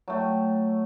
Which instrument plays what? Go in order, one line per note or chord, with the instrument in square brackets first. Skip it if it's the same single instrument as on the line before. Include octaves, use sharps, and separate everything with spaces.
[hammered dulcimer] F#3 A3 G5